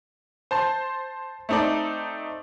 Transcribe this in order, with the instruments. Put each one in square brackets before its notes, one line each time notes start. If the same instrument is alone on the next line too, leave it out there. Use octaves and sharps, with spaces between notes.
[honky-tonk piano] C5 A5 C6
A3 C4 D#4 A4 D5